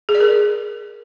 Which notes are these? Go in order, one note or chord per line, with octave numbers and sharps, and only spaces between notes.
G#4
D5
A#4